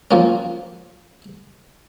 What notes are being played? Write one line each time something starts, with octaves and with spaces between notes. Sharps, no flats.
F3 A#3 C#4